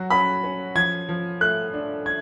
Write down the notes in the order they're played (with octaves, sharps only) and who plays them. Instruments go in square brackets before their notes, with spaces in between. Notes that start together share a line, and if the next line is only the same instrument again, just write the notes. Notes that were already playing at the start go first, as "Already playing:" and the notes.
Already playing: [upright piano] F#3 F#4
[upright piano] C#4 [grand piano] B5
[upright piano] C#4
[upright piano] F3 [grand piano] G#6
[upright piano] F3
[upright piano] A3 [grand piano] F#6
[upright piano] D4
[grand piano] G#6